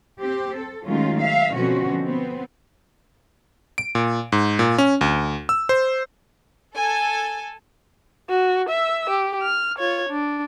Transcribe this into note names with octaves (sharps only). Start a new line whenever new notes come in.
C4 G4
A4
D#3 F#3 G#3 A3 C#4 F4
E5 F5
B2 D3 F3 C4 C#4 F#4
B3 C4
D7
A#2
G#2
A#2
C#4
D2
E6
C5
A4 G#5
F#4
E5 E6
G4
F6
F4 C#5
D4